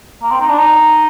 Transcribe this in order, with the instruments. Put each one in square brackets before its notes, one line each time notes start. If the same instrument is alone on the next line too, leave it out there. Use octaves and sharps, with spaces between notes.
[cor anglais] A#3
C4
D#4
D4
D#4